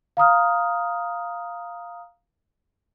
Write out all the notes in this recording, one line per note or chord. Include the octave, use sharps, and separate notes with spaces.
F5 A#5 D#6 F6